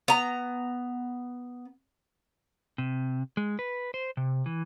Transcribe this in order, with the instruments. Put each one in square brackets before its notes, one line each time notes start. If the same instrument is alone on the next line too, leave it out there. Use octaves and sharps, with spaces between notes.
[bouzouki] B3 A#5
[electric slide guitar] C3
G#3
B4
C5
C3
E3